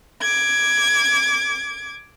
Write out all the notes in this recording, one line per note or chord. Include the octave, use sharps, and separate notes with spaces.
D6 G#6